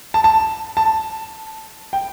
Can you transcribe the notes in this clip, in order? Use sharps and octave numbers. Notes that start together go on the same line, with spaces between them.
A5
A5
A5
G5